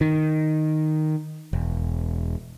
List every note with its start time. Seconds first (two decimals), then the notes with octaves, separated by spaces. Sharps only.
0.01 D#3
1.53 E1